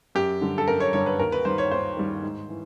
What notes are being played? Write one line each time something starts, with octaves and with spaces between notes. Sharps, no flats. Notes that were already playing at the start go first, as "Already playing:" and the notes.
F#2 G4
D3 G3
A4
F#2 A#4
C#5
D3 G3 C#5
B4
D#2 A#4
B4
D#3 G3 C5
C#5
D#2 C5
D#3 G3
G#2
E3